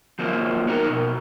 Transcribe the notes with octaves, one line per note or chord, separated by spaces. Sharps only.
F3 F#3 A#3
B3 D#4 A#4
B2